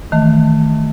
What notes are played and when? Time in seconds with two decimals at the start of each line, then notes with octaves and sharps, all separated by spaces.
0.12 D#3 E3 A3